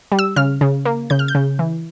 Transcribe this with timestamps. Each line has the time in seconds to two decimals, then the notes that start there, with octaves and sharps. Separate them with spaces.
0.12 G3
0.19 E6
0.36 C#3 F6
0.61 C#3
0.85 A#3
1.10 C#3 G6
1.19 F6
1.28 G6
1.35 C#3
1.59 E3